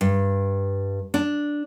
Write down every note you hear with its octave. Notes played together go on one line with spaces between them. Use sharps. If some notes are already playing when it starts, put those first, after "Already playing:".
G2
D4